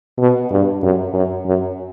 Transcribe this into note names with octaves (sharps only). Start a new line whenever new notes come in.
B2
G2
F#2
F#2
F#2